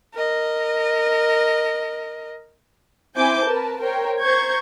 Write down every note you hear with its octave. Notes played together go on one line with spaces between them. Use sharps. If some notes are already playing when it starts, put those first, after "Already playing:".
A#4 D#5
C4 E4 C5 G#5 D6 G6
A#4 B4 A5
A#4 C5 C#5 G5
C5 A#5 C#6 G6 G#6